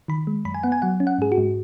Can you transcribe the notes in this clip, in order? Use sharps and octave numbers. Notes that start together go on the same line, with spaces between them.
D#3 B5
G#3
F#2 B5
G#5
B3 F#5
G#5
F#3 F#5
C#4
F#5
G#2 G#4
F#4
G#2